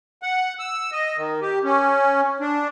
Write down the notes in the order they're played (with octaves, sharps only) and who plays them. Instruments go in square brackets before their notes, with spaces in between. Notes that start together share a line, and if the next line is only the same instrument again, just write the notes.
[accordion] F#5
E6
D#5
D#3
G4
C#4
D4